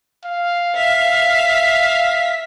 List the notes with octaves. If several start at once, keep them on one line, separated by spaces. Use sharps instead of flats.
F5
E5 B6